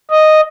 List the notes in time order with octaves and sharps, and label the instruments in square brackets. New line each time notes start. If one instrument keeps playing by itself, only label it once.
[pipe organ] D#5